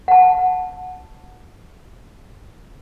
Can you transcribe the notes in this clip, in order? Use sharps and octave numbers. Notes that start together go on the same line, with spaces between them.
F#5 A5